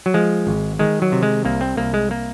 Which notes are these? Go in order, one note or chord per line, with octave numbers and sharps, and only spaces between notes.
F#3
F3 G#3
G#1
D#3 G#3
F#3
C3
G#3
C2 A#3
C4
C2 A#3
G#3
A#3